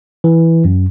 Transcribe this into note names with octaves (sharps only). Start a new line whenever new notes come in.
E3
F#2